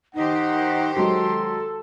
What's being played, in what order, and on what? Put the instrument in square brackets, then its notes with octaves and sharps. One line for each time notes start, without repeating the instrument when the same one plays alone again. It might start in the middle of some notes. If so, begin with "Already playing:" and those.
[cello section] D#3 G4 C5 [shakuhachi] D#4 [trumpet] F#5
[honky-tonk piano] F#3 G#3 [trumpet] A4 [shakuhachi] C6